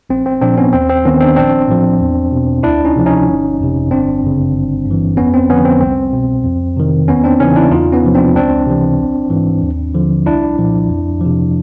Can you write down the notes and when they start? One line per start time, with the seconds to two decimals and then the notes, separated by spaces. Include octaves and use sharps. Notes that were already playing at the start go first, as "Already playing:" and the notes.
0.10 A#1 C4
0.26 C4
0.41 A#2 F3 C4 D4
0.57 B3 C#4
0.73 D#2 C4
0.89 C4
1.05 D#3 B3 C#4
1.20 C4 D4
1.36 A#1 C4 D4
1.68 A2 F3
2.00 E2
2.32 B2
2.63 D2 D4 E4
2.85 C#4 D#4
2.96 C3 F3
3.06 C#4 D#4
3.28 G1
3.59 F2 C3
3.91 G1 C4 D4
4.22 F#2 C#3
4.54 G1
4.85 G2
4.91 E3
5.17 F2 B3 C#4
5.34 C4
5.49 D3 F3 B3 C#4
5.65 C4
5.81 C2 C4
6.13 B2
6.44 F2
6.77 C3 D#3
7.08 E2 B3 C#4
7.24 C4 D4
7.40 C#3 E3 C#4 D#4
7.56 D4 E4
7.71 E2 D#4 F4
7.92 B3 C#4
8.04 C3 F3
8.15 C4 D4
8.35 C#2 C4 D4
8.67 C3 E3
9.00 A#1
9.30 G#2 E3
9.62 D#2
9.94 D3 F3
10.26 C2 D4 E4
10.58 A#2 F3
10.89 F2
11.21 C3 F3